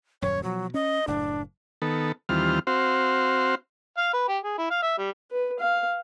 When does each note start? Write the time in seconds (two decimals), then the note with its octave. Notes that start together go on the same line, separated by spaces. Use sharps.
0.22 D#1 F#2 C#5
0.43 B2 F3 F#3
0.74 C#4 D#5
1.08 F#1 A2 D4
1.82 D#3 B3 A4
2.29 D#2 E3 G3 C4 F4 F6
2.67 C4 F#4 C5 F5
3.98 F5
4.13 B4
4.28 G4
4.44 G#4
4.58 E4
4.71 F5
4.83 E5
4.98 G3
5.31 B4
5.60 F5